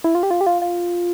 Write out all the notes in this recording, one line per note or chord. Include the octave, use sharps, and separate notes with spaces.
E4
F4
G4
F4
G4
F4
F4